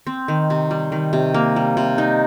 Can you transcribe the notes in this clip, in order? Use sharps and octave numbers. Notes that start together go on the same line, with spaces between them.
C4
D#3
C3
G3
D#3
C3
A#3
G3
C3
D#4